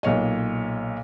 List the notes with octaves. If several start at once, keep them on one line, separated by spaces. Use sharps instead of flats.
B1 A#2 C#5 D#5